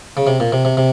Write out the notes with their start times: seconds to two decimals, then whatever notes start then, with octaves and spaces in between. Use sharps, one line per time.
0.17 C#3
0.27 C3
0.40 A#2
0.52 C3
0.65 C3
0.77 C3